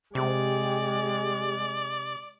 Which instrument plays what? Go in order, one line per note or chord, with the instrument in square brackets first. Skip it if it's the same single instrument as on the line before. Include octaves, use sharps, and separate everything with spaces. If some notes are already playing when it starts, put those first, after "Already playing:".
[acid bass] C3 [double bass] G#3 [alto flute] G4 [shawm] D5